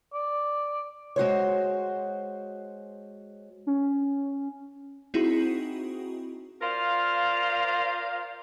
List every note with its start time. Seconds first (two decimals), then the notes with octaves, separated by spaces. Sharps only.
0.14 D5
1.16 G#3 F#4 C5 C#5
3.67 C#4
5.14 C4 D#4 E4 F#4 G#4
6.61 F4 A#4 C5 D5 F5